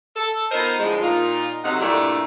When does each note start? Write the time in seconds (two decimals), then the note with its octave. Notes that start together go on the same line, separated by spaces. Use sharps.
0.16 A4
0.51 B3 D#4 F4 A#4 C5 D#5
0.79 A2 D3 F3 G#3
1.02 A#2 D#4 F4
1.64 C3 F#3 A3 D#4 F#5
1.80 G2 A#2 A3 D4 E4 G4